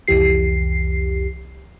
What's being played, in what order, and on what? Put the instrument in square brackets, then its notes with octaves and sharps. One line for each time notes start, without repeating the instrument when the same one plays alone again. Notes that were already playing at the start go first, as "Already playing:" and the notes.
[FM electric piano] C2 F2 E3 G4 C7